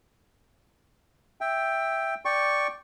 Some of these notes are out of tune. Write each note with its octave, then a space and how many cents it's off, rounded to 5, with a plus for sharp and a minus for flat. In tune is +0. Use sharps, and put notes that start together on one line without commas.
E5 +0 G5 +10
D5 +0 G5 +0 C#6 -5